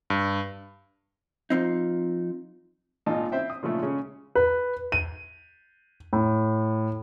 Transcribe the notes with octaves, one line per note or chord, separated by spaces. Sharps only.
G2
F3 C4 D#4
G#1 A#2 D#4 F4 A5
C4 E4 C5 E5 G5
D#6
A#2 C#3 F3 G#3 A3
C#3 G#3 C#4 G#4
B4
D#7
A2